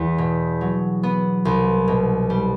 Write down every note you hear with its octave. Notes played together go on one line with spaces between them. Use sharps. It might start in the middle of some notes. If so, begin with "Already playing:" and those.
Already playing: E2
B2
F#3
B3
C2
B2
G3